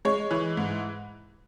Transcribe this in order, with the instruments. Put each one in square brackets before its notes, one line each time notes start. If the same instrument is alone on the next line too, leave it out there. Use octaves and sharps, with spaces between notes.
[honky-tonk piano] G#3 C#5
E3
G#2